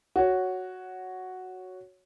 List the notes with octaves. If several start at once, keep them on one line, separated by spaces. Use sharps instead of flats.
F#4 C#5